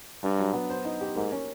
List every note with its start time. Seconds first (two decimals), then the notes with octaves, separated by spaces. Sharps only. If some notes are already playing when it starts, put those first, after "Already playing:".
0.23 G2 D4
0.39 F#3
0.53 B3
0.70 C5
0.85 D#4
1.01 G4
1.16 G#2 A#3
1.32 C#4